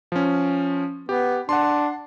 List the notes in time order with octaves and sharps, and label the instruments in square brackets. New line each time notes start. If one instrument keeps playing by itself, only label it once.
[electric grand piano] F3 C#4
[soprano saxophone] B3 [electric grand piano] G4
[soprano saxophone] D4 [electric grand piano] F#5 C6